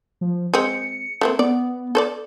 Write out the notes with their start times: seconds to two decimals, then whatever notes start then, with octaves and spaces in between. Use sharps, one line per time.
0.21 F3
0.54 G#3 C4 C#7
1.21 A3 A#3 C4
1.39 B3 D5
1.95 A4 C5 D5